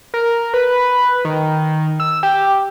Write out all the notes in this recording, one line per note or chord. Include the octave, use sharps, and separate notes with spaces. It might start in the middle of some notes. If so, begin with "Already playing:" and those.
A#4
B4
D#3
E6
G4